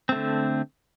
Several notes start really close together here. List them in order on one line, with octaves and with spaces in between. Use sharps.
C4 A3 D3